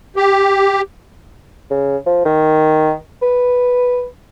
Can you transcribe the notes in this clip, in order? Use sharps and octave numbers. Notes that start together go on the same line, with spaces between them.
G4
C#3
F3
D#3
B4